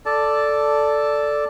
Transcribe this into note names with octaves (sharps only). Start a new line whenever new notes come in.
A4 D5 A5